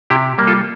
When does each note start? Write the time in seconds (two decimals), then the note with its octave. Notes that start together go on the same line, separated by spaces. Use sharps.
0.10 C3 E4 G4
0.38 G3 A#3
0.47 F4 A4